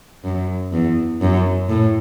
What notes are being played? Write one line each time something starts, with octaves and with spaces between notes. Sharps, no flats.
F#2
E2
F#2
A2